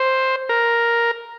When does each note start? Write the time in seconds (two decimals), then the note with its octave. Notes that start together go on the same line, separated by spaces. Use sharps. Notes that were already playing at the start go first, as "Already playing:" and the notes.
Already playing: C5
0.49 A#4